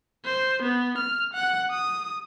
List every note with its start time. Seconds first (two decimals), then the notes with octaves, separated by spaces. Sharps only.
0.25 C5
0.62 B3
0.98 F6
1.33 F#5
1.70 D#6